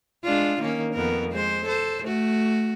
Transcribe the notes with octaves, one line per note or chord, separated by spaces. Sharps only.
G#3 D4 F4
D#3 A#3 C#4
F2 B3 A#4
G#3 C5
A4 C5
A3 F#4